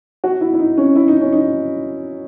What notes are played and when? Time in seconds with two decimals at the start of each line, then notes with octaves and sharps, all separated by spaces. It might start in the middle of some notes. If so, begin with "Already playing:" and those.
0.24 F#4
0.41 E4
0.54 E4
0.59 D#4
0.77 C#4
0.96 E4
1.08 D#4
1.21 C#4
1.33 D#4